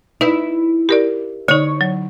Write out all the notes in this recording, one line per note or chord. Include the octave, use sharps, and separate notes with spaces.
D#4 E4 B4
G4 A#4 D5
D3 D#4 C#5
F#3